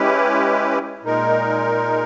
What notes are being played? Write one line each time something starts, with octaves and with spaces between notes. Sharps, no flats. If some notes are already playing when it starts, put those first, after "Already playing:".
Already playing: G#3 C#4 E4 G4 B4
A#2 G#3 D#4 A#4